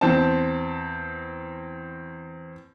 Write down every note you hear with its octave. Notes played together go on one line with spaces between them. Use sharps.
E2 C4 A5